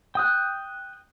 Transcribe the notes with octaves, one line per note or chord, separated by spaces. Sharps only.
G5 D#6 F#6